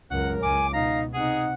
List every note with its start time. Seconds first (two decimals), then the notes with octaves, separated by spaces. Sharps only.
0.11 C#2 F#2 A#4 F#5
0.43 C#2 G#5 D6
0.73 B2 D#4 F5 A#5
1.14 C3 D#4 G#4 F#5